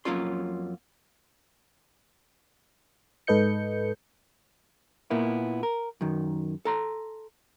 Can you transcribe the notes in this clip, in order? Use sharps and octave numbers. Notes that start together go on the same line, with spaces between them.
F2 F#3 A#3 C#4 F4 C6
G#2 A4 B4 D#5 G6 C#7
A#2 A#3 B3 E4
A#4
F#2 D#3
A4 A#5 C6